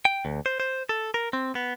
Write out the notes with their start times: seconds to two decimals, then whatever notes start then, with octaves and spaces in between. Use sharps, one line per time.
0.05 G5
0.25 D2
0.46 C5
0.60 C5
0.89 A4
1.14 A#4
1.33 C4
1.55 B3